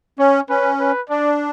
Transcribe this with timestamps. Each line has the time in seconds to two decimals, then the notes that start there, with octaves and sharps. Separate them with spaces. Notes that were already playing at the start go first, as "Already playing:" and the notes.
0.19 C#4 C#5
0.49 C#4 B4
0.80 B4
1.10 D4 D5